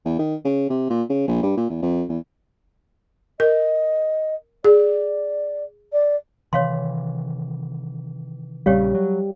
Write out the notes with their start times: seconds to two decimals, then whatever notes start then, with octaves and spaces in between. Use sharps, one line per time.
0.05 E2
0.19 D#3
0.44 C#3
0.70 C3
0.90 A#2
1.10 C#3
1.28 A#1
1.43 G2
1.57 A#2
1.70 E2
1.82 F2
2.09 E2
3.40 A#4 D#5
4.65 G#4 D5
5.93 D5
6.53 C3 D#3 E3 C#5 F5 C6
8.66 A#1 C#3 G3 G4 C#5 F5
8.94 F#3